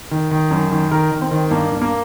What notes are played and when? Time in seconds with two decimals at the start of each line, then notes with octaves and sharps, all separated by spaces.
0.11 D#3
0.31 D#3
0.51 F#2
0.71 D#3
0.91 D#3 A#4
1.11 D#3
1.22 C4
1.31 D#3
1.51 G2 A#3
1.72 G2
1.81 A#3